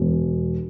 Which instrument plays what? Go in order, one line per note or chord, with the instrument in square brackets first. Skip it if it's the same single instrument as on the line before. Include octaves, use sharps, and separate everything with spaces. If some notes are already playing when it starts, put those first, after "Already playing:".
Already playing: [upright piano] E1